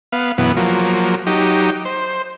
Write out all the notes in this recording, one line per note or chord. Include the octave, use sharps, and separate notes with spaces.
B3 F5
F#2 B2 E3 B3
F3 F#3 A#3
F#3 D#4 G4
C5